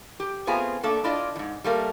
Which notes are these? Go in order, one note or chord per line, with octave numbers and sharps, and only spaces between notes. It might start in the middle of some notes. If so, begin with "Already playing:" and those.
G4
A3 B3 C4 F4 G#4 G#5
A3 A#3 D4 A4
D4 E4 F4 D5 D#5
E2 G#2
G3 A3 A#3